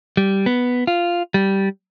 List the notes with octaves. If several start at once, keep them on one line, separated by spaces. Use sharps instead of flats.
G3
B3
F4
G3